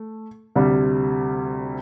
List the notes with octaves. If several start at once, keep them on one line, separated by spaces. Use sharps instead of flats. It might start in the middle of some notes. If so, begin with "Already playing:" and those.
Already playing: A3
D2 C3 G3